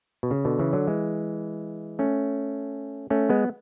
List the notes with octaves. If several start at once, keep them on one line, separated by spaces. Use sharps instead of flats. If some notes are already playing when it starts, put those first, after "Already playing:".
B2
C#3
B2 D3
C#3 E3
D3 F#3
E3 G#3
A3 C#4
A3 C#4
G#3 B3